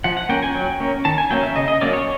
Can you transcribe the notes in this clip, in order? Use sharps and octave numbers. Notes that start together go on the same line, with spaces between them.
F3 F#5
F#5
A#3 C#4 G5
G#5
F#3 G5
A#3 C#4
D#3 A5
G#5
F#3 A#3 C#4 G5
E5
C#3 D#5
D#5
F#3 A#3 C#4 D5
C#5